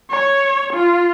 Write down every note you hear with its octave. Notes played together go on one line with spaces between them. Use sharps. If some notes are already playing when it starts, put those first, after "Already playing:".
C#5
F4